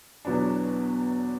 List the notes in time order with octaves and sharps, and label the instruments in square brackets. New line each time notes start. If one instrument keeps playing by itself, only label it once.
[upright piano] E2 B2 F#3 B3 D4